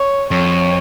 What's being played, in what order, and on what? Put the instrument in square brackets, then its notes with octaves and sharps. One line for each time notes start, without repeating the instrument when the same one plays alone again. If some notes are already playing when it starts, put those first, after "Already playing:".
Already playing: [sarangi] C#5
[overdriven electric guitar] F2 [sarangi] C#5